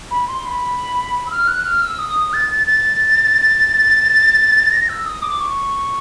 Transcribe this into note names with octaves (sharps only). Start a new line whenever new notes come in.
B5
C6
B5
E6
F6
F#6
F6
E6
D#6
A6
A6
A#6
E6
D#6
D6
C#6